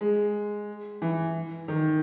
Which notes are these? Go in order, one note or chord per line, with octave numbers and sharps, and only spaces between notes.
G#3
E3
D#3